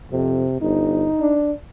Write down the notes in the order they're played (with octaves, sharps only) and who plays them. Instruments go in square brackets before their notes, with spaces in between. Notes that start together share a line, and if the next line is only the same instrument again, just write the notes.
[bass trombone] F2 [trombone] C3
[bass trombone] G1 [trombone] D#4
[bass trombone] D4